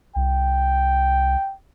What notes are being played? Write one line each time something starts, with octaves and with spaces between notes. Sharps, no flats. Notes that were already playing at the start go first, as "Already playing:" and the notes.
C2 G5